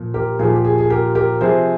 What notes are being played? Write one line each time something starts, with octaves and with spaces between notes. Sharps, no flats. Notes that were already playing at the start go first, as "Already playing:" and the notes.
Already playing: A#2 F3
G4 A#4
A#2 F3 G#4
G4
G#4
G#4
G4 A#4
G4 A#4
C3 F3 G#4 C5